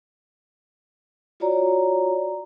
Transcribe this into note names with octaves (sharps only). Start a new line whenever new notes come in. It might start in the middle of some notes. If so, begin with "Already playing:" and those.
F4 F#4 C#5 D5 A#5